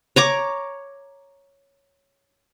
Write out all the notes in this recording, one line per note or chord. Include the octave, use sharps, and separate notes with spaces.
C#5 A#5 D6